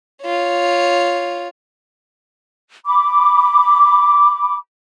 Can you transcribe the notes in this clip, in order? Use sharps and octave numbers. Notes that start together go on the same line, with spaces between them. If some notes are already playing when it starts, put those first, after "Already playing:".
F4 C#5
B5 D6